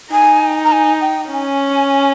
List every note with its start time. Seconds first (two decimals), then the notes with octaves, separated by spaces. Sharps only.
0.12 D#4 G#5
0.64 A#5
0.72 G#5
1.01 G5
1.32 C#4 G#5